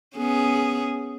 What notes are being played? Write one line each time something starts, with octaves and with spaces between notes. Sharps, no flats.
B3 C#4 G#4